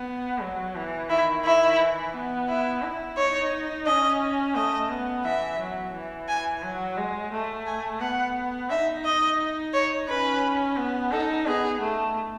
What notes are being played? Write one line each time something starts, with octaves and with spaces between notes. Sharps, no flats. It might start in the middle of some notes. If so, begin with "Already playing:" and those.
Already playing: B3
F#3
E3
D#3 E4
E4
E3
B3
E4
E4
D#4 C#5
C#4 D#5
A3 D#5
B3
E3 E5
F#3
E3
G#5
F#3
G#3
A3
G#5
B3 F#5
D#4 E5
D#5
C#5
C#4 B4
B3
D#4 A4
B3 G#4
A3